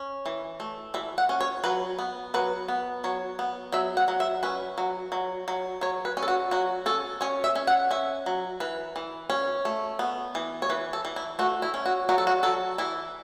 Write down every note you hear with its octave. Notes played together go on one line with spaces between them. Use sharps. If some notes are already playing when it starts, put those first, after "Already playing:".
Already playing: C#4
E3
A3
E3 E5
F#5
C#4
C#5
F#3 B4
B3
F#3 B4
B3
F#3 C#5
B3
F#3 E5
F#5
F#3
E5
C#4 B4
F#3
F#3
F#3
F#3 C#5
B4
C#4
A4
F#4
F#3 F#4
C#4 A4
C#4 C#5
E5
C#4
F#5
C#4 E5
F#3
E3 B4
E3
C#4
A3
B3
E3
C#5
E3 B4
A4
E3
E4
A3 F#4
E4
C#4
F#4
F#3 F#4
A4
F#4
F#3 A4
E3 E4